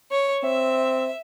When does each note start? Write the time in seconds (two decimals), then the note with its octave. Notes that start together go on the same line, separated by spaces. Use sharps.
0.11 C#5
0.44 C4 E5